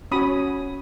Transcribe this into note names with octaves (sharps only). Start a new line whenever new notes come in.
C#4 F#4 C#5 B5 D#6